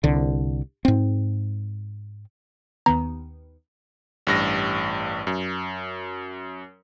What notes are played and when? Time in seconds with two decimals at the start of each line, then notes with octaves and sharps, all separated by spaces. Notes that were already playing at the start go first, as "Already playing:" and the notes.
0.04 C2 D3
0.85 G#2 C4
2.86 D#2 D#3 B3 A#5
4.27 A1 G2 A#6
5.27 F#2